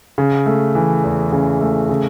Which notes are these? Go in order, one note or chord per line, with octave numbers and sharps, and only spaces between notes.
C#3
A3
E3
E2
C#3
A3
C#3